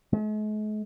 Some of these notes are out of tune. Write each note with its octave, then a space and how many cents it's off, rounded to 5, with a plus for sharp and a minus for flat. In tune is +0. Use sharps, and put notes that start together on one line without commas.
G#3 +45